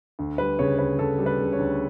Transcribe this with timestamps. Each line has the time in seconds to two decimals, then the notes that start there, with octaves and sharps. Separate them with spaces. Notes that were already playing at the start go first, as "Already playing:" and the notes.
0.19 D2
0.38 G3 B4
0.59 C#3 C#5
0.78 D2 B4
0.99 D2 A4
1.19 G3
1.26 B4
1.39 C#3
1.53 C#5
1.59 D2